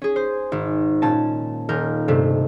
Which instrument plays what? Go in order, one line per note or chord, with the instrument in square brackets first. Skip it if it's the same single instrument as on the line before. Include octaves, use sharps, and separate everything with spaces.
[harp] C#4 G#4
C5
G#1
A#2 C#4 A5
D#1 A#4 G6
G2 C3 A3